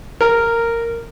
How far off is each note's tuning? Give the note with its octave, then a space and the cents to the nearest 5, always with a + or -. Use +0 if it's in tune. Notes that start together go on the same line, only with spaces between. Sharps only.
A#4 -10